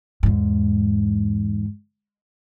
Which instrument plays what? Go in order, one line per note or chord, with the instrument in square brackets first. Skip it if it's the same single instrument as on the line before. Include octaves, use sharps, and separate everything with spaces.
[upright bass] E2 G#2